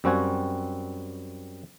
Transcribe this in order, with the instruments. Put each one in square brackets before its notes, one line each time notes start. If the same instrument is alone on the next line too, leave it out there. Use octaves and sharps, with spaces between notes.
[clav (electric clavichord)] F#2 G3 C4 F#4 G#5